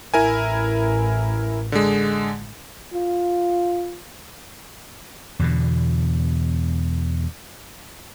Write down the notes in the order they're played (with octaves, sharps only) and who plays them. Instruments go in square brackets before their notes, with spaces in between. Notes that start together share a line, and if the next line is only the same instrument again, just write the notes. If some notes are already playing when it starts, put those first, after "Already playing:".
[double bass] A1 [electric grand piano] E4 A#4 G#5
[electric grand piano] D3 G#3
[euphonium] F4
[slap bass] E2 B2 D3